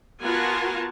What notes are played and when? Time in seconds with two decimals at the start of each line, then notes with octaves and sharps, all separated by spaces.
0.21 B3 F4 F#4 A#4 G#5 A5